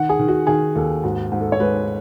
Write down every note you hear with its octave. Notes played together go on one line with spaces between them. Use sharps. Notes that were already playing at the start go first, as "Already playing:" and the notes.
Already playing: D#3 F#5
G#4
D#3
F#4
D#3 G#4
D#2 A4
G#2 F#4
G#2
A4
C#5
G#3 B4